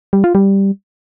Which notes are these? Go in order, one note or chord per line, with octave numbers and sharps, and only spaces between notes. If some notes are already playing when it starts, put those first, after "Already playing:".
G3
F4
G3